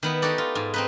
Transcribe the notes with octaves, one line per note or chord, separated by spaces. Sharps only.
D#3 B3 E4
D#4 F#4 G4 A4 D5
F4
G#2
C4 D#4 B4